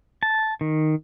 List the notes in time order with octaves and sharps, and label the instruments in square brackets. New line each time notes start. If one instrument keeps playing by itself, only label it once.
[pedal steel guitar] A5
D#3